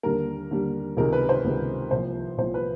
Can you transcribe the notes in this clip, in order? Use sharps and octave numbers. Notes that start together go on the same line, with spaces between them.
D#2 D3 G3 A#4
D#2 D3 G3
C#2 C3 D#3 G#3 A#4
B4
C5
C#2 C3 D#3 G#3
C2 A#2 F3 C5
C2 A#2 F3 C5
B4